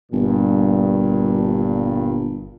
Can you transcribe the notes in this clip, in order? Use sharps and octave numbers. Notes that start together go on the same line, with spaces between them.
G1 G2 A#2